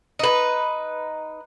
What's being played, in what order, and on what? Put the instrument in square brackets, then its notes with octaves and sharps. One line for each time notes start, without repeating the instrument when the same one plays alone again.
[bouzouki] D#4 B4